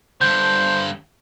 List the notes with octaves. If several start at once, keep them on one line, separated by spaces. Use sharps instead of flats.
G2 D3 C5 G6